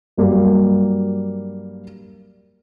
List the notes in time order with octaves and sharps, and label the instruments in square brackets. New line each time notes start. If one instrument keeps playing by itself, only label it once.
[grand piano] G2 F#3 G3 A#3